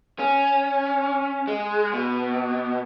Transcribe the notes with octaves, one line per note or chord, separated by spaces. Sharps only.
C#4
G#3
B2